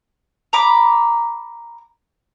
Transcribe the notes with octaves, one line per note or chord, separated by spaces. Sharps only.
A#5 B5 D6